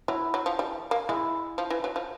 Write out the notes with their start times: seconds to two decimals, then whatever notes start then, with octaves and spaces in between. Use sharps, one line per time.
0.08 F#3 E4
0.34 F#3
0.46 F3
0.59 G3
0.91 A#3
1.09 G#3 E4
1.58 F3
1.70 E3
1.84 F#3
1.96 F3